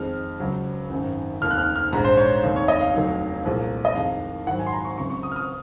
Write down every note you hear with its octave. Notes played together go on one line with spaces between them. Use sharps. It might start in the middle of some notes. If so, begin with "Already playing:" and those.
Already playing: F2 D#3 G#3 F6
C#2 C#3 F#3
G#1 F#2 D#3
F1 D#2 D#3 F6
F#6
F6
F6
A#1 G#2 D#3 G#3 A#5
C5
C#5
F1 D#2 D#3
C#5
D#5
F5
F1 D#2 D#3 F#3
C2 A#2 F3 G#3
D#5
F2 D#3 G#3 F5
G#1 G#2 D#3 F#3 F#5
G#5
C6
A#5
C#6
C#2 C3 F#3 C#6
C#6
D#6
F6
D#6